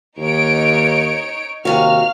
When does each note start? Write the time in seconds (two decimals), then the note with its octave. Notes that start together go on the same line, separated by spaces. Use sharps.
0.17 D#2 D#4 C#5 D7
1.65 D#2 C3 F#4 F5 F6